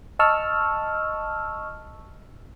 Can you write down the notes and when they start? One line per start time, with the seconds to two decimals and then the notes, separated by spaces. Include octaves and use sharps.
0.19 D#5 A5 C#6 E6 F6